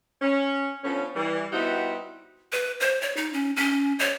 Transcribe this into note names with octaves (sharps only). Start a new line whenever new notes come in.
C#4
D3 F3 B3 C#4
E3 G3
G3 B3 C4 D#4 E4 F#4
B4
C5
C#5
D#4
C#4
C#4
C#5